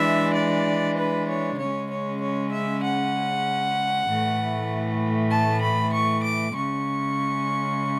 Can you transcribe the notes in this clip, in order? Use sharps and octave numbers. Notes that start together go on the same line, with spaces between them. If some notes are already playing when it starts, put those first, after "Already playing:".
Already playing: E3 G#3 D4 E5
D5
B4
C#5
C#3 G#3 C#4 C#5
C#5
C#5
E5
F#5
A2 E3 A3
A5
B5
C#6
D6
C#3 G#3 C#4 C#6